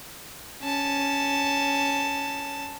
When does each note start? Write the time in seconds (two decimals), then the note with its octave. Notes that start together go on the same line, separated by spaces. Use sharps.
0.62 C#4 A5